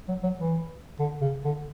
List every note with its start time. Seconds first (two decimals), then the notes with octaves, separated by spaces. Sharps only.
0.08 F#3
0.23 F#3
0.38 E3
0.99 D3
1.21 C#3
1.44 D3